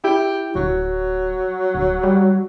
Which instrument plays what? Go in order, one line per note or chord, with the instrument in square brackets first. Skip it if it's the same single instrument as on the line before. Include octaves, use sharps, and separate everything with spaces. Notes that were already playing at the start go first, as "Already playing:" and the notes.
[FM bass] E4 [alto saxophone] G4
[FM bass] D1 [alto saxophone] F#3
[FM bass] D1
G3